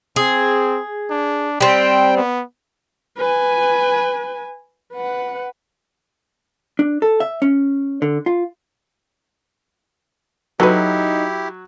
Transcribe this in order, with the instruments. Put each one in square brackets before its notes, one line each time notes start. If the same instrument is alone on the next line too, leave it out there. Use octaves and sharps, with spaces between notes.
[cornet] C4 [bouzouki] G#4
[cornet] D4
[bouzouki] G3 C4 [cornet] G5
[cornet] B3
[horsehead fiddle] B4 G#5
B4 F#5
[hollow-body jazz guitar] D4
A4
E5
C#4
D3
F4
[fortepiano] F#3 [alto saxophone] D#4 [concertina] E4 G4 [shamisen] A4 B4